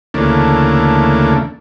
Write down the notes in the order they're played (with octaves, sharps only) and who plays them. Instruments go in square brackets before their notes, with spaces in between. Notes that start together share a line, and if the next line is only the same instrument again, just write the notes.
[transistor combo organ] D2 C#3 E3 A3 A#3 D4